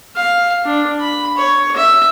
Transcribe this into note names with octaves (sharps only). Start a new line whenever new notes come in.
F5
D4
B5
C#5
E5